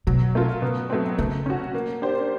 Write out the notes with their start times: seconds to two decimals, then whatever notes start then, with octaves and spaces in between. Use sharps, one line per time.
0.07 B2 F#3
0.35 A3 C#4 F4 A#4
0.62 B2
0.90 F#3 A3 C4
1.19 C#3 A3
1.46 C#4 F#4
1.74 A#3
2.02 D4 G4 C5